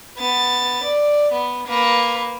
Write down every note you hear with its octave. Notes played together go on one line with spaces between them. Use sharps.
B3 A6
D5
B3
A#3 B4